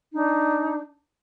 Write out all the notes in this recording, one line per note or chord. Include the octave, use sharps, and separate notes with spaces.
D4 D#4